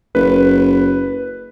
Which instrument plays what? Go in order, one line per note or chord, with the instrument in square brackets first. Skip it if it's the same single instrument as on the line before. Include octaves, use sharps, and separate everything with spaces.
[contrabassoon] F#1 [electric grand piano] B4